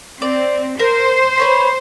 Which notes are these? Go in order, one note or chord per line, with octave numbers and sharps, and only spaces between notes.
C4 D5
A#4 C5
B4 C#5 B5